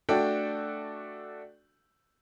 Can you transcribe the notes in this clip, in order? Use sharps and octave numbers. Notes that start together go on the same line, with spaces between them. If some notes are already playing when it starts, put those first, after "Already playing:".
A3 D4 F#4 A4 G5